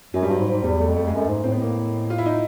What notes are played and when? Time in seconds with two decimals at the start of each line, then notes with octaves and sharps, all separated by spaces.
0.14 F#2 F#3
0.22 G3
0.26 G2 F#3
0.38 G#2
0.51 G#2
0.63 E2 G3
0.80 A3
0.88 F2
0.96 A3
1.07 G#3
1.13 F#2
1.19 A3
1.29 G#2
1.44 A2 C4
1.52 B3
1.62 A#3
2.10 F4
2.18 E4
2.26 D#4